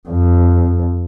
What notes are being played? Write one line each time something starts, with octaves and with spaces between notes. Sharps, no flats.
F2